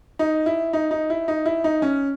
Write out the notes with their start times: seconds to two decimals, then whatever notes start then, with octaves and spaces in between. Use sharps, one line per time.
0.19 D#4
0.46 E4
0.73 D#4
0.91 D#4
1.10 E4
1.28 D#4
1.46 E4
1.64 D#4
1.82 C#4